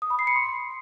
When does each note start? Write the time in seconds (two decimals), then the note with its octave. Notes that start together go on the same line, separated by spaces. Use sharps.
0.02 D#6
0.10 B5
0.19 C7
0.27 C#7
0.36 C6